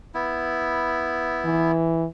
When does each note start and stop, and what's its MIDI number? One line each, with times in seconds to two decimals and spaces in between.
0.14 1.71 59
0.14 1.71 64
1.45 2.06 52